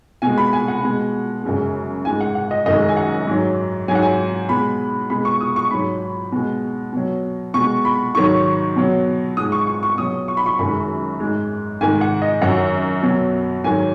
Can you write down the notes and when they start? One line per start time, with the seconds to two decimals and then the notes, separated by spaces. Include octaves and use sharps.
0.22 B2 G#3 G#5
0.38 B5
0.53 G#5
0.68 F#5
0.83 B2 G#3
1.44 F#2 C#3 G#3
2.05 G#2 G#5
2.09 G#3
2.21 F#5
2.35 F#5
2.51 D#5
2.66 F#2 D#3 G#3 D#5
2.88 G#5
2.97 F#5
3.27 G#2 F#3
3.88 F#3 G#5
3.91 G#2 F#5
4.02 G#5
4.49 B2 G#3 B5
5.10 B2 G#3 B5
5.25 C#6
5.41 D#6
5.56 C#6
5.71 G#2 F#3 B5
6.32 B2 G#3
6.93 B2 F#3
7.54 B2 G#3 C#6
7.85 B5
8.15 G#2 D#3 F#3 C#6
8.76 B2 F#3
9.37 G#2 G#3 D#6
9.52 C#6
9.67 C#6
9.83 C#6
9.98 B2 F#3 D#6
10.28 C#6
10.37 B5
10.46 C#6
10.59 F#2 D#3 G#3 B5
11.20 G#2 G#3
11.81 G#2 D#3 G#3 G#5
12.01 F#5
12.22 D#5
12.41 F#2 D#3 F#3 F#5
13.03 B2 F#3
13.64 G#2 D#3 F#3 G#5